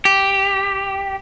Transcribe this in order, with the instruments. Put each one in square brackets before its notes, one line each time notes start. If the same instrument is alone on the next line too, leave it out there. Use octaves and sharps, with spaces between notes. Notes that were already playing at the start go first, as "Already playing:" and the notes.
[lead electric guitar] G4